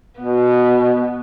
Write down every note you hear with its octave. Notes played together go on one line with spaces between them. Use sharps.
B2 B3